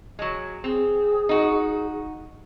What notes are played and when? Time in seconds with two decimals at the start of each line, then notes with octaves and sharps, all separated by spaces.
0.19 F#3 G#3
0.64 C4 G#4
1.29 D#4 F#4